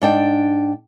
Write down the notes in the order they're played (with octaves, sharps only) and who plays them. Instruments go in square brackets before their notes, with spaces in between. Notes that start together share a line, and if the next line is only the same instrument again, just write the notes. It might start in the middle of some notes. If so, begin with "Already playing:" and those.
[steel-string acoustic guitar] G#2 D4 G5